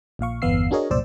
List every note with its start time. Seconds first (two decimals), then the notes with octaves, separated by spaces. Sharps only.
0.19 A#1 A#2 F5 C#6
0.42 G1 E2 B3 F5 E6 C7
0.71 D4 F#4 G#4 A#4 C#5 D#5
0.90 C2 F#2 A#2 C5 D5 E6